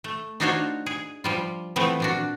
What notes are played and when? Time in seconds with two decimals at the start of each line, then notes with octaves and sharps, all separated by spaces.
0.04 A3
0.40 D4 D#4 F4 F#4 C5 C#5
0.86 G#4
1.24 F3 G3 F4
1.76 E3 F3 A3 B3 C4
2.00 A#2 D4 F#4